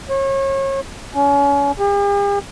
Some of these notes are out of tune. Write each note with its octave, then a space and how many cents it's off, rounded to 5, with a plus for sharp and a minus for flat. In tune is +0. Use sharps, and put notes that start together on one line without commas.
C#5 -35
C#4 +30
G4 +45